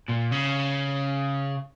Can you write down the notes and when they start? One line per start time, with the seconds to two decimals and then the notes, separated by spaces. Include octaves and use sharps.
0.09 A#2
0.32 C#3